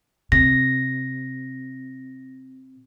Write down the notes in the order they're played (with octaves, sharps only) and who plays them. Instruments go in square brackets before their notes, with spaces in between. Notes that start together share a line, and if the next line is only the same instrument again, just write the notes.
[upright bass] C3 [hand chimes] A#6